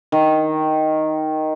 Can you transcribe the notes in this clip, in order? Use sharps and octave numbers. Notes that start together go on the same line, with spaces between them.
D#3